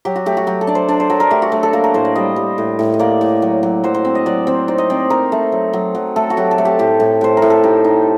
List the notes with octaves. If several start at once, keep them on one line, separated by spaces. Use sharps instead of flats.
F#3 G4
F#4
A3 G4
F#4
F#3 G4
A4
D4 D5
C5
D4 D5
C5
F#3 A#4
A#4
A3 G4
F#4
A3
A4
A#3 A#4
A#4
A2 C5
D5
G3 D#5
G3
A2
A2
D#5
A#3 D5
A2
F#3
F#3
F#3 C5
C5
C4
D#5
F#3 D5
C4 C5
D#4 D5
D#5
C4 D5
D#4 A#4
A3
F#3
F#3
F#3
A3 A4
F#4
F#3 G4
A4
A3
G4
A2 G4
A2
A2 C5
A#4
A2
A4
D#4 G4
D#4